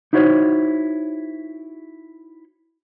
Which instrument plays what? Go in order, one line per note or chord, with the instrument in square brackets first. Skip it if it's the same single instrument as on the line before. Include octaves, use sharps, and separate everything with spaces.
[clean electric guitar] D#4 E4 F#4 C5 C#5